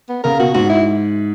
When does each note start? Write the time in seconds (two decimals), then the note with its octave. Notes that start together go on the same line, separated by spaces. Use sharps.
0.09 B3
0.24 C#3 A#4
0.39 B2 F#4
0.54 G#2 F#4
0.70 E4